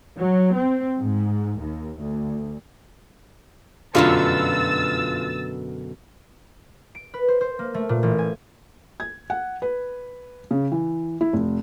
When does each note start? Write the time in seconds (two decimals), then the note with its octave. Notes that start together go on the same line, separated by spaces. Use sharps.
0.17 F#3
0.55 C4
0.99 G#2
1.58 D#2
1.98 D2
3.95 F1 F#2 B2 D3 F4 E6 A6
6.95 D7
7.14 B4
7.28 C5
7.41 C5
7.59 A#3
7.74 A3
7.89 A#2
8.03 A1
8.18 G#5
9.00 G#6
9.30 F#5
9.62 B4
10.51 C#3
10.72 E3
11.21 E4
11.33 F1